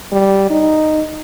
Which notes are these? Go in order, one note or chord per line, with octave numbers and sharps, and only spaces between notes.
G3
D#4